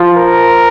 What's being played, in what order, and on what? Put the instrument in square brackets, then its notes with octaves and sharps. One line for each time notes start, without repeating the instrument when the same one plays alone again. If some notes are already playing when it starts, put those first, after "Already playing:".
Already playing: [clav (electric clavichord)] F3
[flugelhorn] A#4